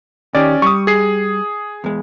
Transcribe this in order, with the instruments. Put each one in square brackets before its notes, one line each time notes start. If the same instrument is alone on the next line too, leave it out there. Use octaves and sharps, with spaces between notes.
[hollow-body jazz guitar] D#3 G4 [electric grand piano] C#4 D5
[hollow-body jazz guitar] G3 [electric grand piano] C#6 D#6
[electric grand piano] G#4 C7
[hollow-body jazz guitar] E2 G#3